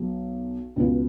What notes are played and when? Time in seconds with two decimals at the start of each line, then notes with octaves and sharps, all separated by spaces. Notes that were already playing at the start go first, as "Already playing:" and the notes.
Already playing: B1 B2 F#3
0.76 C#2 B2 B3 F#4